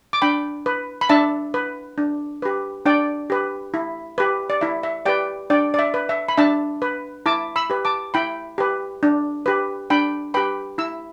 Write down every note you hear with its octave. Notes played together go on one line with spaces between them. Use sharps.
D6
D4 G5 B5
B4
B5
D4 E5 A5
B4
D4
G4 B4
D4 D5 G5
G4 B4
E4
G4 B4
D5
E4 E5
E5
G4 B4 D5 G5
D4 D5 G5
D5
E5
B4
E5
B5
D4 E5 A5
B4
E4 A5 D6
B5 E6
G4 B4
A5 D6
E4 G5 B5
G4 B4
D4
G4 B4
D4 G5 B5
G4 B4 G5 B5
E4 E6